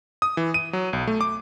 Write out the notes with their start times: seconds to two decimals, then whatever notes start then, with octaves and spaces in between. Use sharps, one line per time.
0.22 D#6
0.37 E3
0.54 D#7
0.73 F#3
0.93 B1
1.07 A3
1.21 D6